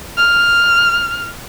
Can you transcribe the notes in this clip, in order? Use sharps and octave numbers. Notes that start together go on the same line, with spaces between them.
F6